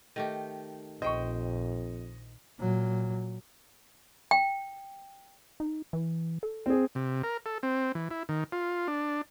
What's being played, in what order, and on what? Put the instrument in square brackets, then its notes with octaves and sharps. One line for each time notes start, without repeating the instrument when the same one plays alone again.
[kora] D#3 A3 G4
[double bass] A#1 [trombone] F2 [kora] C5 G5 [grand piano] D#5 C#6
[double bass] A#2 F#3
[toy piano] G5
[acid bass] D#4
E3
A4
[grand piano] C4 G#4
[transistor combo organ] C3
A#4
A4
C4
E3
E4
D#3
F4
D4